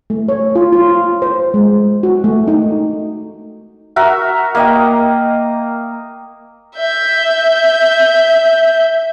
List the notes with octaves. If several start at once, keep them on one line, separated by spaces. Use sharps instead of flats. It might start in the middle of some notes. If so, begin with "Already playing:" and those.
A3
C#5
F4
F4
C5
G#3
F#4
A3
D#4
F#4 A#4 E5
A#3 D#5 G5
E5 G6